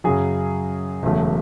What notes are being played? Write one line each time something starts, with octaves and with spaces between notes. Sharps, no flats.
F#2 C#3 F#3 G#4
E1 E2 C#3 F#3 A3